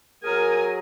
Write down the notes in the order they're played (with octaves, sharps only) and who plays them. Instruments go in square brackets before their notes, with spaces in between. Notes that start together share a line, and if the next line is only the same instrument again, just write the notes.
[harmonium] F#3 G#4 [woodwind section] A#4 [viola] G#5